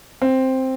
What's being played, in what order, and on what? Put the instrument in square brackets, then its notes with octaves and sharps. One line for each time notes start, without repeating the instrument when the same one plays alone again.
[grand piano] C4